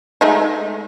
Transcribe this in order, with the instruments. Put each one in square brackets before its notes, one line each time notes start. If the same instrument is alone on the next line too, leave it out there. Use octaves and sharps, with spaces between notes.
[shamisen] G#3 A3 D#4